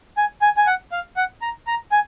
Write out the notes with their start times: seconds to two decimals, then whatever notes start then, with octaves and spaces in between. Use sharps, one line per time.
0.17 G#5
0.42 G#5
0.57 G#5
0.67 F#5
0.92 F5
1.17 F#5
1.42 A#5
1.67 A#5
1.92 G#5